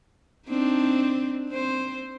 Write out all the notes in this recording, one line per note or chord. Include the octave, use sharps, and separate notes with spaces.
C4 D4 D#4
C4 C5